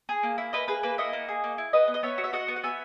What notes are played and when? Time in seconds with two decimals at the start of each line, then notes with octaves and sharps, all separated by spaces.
0.09 G#4
0.23 A#3
0.38 E4
0.53 A#3 B4 D#5
0.68 G#4 B4
0.83 A#3 B4
0.98 E4 D#5 F#5
1.13 A#3
1.28 G#4
1.44 A#3
1.58 E4
1.73 F#4 B4 D#5
1.88 B3
1.94 D#5
2.03 B3 C#5 E5
2.18 F#4
2.24 E5
2.33 F#4 D#5 F#5
2.48 B3
2.56 F#5
2.63 B3 E5 G#5